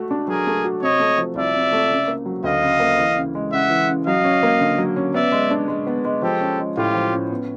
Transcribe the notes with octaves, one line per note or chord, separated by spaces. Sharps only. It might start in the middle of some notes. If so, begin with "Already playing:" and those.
Already playing: A3 F#4
D4
F#3 G#4 A#4
A3
F#4
C3 C#5 D#5
A3
F3
C2 D5 E5
C3
A3
C#3
A#3
F#3
D2 D#5 F5
C#3
A#3
E3
C#3
G#3
C#3 E5 F#5
E3
C#3
F#3 D#5 F5
C#4
A#3
D3
F#3
C#4
B3 D5 E5
G#3
D4
G#3
B3
G#3
F3 G4 A4
C#4
G#3
A2 F4 G4
F3
C#4
B3